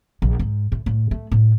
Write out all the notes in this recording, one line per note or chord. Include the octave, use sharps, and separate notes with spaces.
A#1
G#2
A2
A2
A3
A2